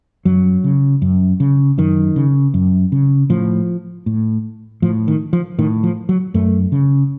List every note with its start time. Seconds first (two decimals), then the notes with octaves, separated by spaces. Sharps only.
0.25 F#2 F#3
0.64 C#3
1.02 F#2
1.40 C#3
1.78 F#2 D#3
2.16 C#3
2.54 F#2
2.92 C#3
3.30 A2 F3
4.06 A2
4.82 A2 F3
5.08 D#3
5.33 F3
5.59 A2 D#3
5.83 F3
6.09 F#3
6.34 F#2 A3
6.72 C#3